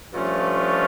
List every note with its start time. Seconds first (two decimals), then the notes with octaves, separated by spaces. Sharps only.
0.12 G2 F3 A3 C#4 F4